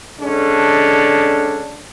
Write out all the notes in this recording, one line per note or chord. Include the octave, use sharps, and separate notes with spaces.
D3 G#3 C#4 D4 A4